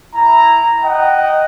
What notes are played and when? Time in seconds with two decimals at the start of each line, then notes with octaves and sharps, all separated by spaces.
0.15 E4 A#5
0.84 D#5 F#5 G5